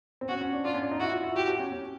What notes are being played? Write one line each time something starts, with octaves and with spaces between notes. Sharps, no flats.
C4
C#4 F#4
C#4
D4
D4 F4
C#4
D4
D#4
E4 F#4
F4
E4
F#4 G4
G4
C#4
C#4